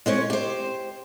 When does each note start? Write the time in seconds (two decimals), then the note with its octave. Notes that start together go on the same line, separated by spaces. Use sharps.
0.06 G#3 C4 C#4 C#5
0.30 G4 C5